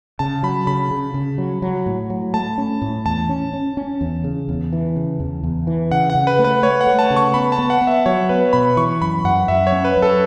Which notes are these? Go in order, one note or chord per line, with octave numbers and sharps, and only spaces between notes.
C#3 A5
F#3 B5
C#3 B5
C#3
C#3
F#3
F#3
A2
F#3
A3 A5
C#4
A2
E2 A5
C#4
C#4
C#4
E2
C#3
E2
E3
C#3
E2
E2
E3
C#3 F#5
F#5
C#3
B4
A3
B4
A3 C#5
F#5
A3
A5
C#3
C#6
B3 B5
A5
B3
F#5
B3
E5
F#3 C#5
B3 B4
B2 B5
E3 C#6
F#2 B5
F#2 F#5
F#2 E5
C#5
C#4
B4
F#2
A4